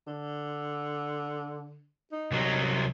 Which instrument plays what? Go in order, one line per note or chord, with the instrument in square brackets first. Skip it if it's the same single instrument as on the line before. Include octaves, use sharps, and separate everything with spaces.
[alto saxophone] D3
D#4
[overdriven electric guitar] C2 F#3